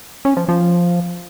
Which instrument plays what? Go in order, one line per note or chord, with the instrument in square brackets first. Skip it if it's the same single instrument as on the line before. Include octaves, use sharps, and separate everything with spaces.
[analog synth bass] C#4
F3
F3